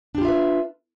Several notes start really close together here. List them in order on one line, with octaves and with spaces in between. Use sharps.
D4 G4 F4 E5 B4